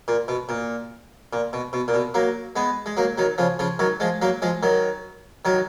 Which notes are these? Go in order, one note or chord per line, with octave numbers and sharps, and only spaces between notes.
A#2
B2
A#2
A#2
B2
B2
A#2
B2
F#3 A#3
G#3 B3
G#3
F#3 A#3
D#3 F#3
C#3 F3
C#3 F3
D#3 F#3
F3 G#3
F#3 A#3
F3 G#3
D#3 F#3
D#3 F#3